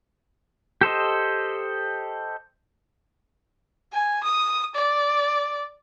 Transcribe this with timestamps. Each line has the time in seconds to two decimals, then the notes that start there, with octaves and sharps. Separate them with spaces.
0.81 G4 A4 C5 D#5
3.92 G#5
4.24 D#6
4.75 D5